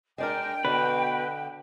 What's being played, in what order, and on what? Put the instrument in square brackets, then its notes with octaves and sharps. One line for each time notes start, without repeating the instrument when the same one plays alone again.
[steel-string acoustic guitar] G#3 D4 A#4 [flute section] G5
[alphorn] B2 [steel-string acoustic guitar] D3 [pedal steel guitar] B4